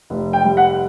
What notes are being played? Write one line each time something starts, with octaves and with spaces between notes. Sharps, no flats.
F1
G5
G3
F#5